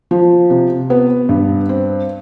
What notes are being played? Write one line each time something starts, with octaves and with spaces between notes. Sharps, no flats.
F3
C3
B3
G2
C4